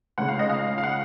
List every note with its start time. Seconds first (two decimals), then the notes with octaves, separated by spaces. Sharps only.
0.18 C#2 C#3 G#3 F#5
0.28 F5
0.39 D#5
0.49 F5
0.78 F5
0.83 F#5